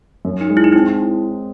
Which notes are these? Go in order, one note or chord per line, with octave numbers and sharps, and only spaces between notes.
F#2
D#4
G#3
E4
D#4
C4 E4